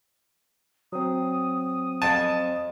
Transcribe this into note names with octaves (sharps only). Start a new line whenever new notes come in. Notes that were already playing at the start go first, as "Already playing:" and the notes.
F#3 C4 D#6
F2 G#5 A5